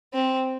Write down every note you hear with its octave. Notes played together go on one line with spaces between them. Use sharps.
C4